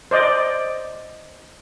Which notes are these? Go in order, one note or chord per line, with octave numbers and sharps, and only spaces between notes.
C5 D5 D#5